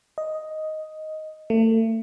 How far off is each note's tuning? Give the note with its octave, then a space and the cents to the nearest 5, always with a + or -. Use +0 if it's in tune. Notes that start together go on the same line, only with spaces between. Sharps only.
D#5 +5
A3 +35